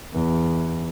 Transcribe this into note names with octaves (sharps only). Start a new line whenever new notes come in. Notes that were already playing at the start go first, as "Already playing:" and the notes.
E2